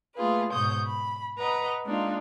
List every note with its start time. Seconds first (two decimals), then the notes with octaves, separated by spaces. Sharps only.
0.16 A3 A#3 F4 G#4 B4
0.52 G#2 B2 C#5 D#6 G6
0.88 B5
1.39 B4 D#5 F#5 A#5
1.84 G#3 A#3 D4 D#4 F4